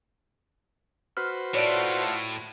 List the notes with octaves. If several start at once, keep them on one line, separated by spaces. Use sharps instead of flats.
F#4 B4 C5 F6
A2 A3 F4 C#5 D5 F#5 D7